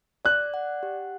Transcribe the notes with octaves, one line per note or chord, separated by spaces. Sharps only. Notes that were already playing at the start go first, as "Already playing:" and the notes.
D5 F#6
F#5
G4